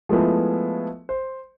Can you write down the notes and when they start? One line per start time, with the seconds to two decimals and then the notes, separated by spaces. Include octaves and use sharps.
0.09 F3 G#3 A3 B3 E4
1.09 C5